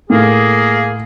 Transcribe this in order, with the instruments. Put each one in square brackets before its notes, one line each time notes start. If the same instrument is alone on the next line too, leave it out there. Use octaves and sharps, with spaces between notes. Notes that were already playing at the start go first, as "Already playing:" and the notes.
[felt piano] A2 [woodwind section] A#3 G#4